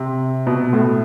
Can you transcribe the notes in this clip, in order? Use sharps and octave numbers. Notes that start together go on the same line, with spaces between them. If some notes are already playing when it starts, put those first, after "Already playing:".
Already playing: C3
B2
A2